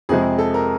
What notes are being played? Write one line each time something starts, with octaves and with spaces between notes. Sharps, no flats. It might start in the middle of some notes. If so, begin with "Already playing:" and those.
F2 C3 F3 G#3 G#4
A4
A#4